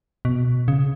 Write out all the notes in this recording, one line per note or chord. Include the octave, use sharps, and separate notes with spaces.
B2
C#3